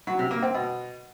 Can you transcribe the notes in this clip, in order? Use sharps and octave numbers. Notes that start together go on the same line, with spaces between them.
F#3
C3
A#3
C4
B2